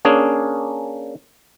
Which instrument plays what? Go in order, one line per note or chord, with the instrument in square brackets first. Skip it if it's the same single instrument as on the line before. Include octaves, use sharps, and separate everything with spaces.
[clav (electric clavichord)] A#3 C#4 D4 G#4